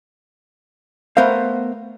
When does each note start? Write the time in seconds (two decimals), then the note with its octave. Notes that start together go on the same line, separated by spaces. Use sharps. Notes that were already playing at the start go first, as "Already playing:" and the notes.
1.17 A3 B3 A#4 C5 F5